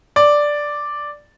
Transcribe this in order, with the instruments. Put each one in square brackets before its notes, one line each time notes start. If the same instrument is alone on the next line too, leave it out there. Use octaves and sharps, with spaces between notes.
[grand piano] D5